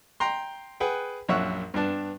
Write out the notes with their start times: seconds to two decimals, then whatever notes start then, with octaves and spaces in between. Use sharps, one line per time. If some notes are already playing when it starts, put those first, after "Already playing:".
0.20 G5 A#5 C6
0.80 G#4 B4 F#5 G5
1.29 A#1 F#2 C#5 E5 F#5
1.74 G2 B3 D4 A5